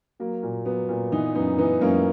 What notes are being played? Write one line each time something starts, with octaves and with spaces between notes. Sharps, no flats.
F#3 A#3
A#2
F#3 B3
A#2
E3 B3 D#4
F#2 B3 D#4
E3 B3 D#4
F#2 A#3 C#4